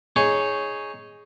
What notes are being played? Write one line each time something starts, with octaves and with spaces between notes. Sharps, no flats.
D#4 G#4 C#5